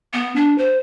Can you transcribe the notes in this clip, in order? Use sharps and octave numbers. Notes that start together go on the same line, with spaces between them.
B3
D4
C5